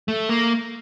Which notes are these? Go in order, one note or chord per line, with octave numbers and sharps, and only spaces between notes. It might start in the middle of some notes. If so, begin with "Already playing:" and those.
A3
A#3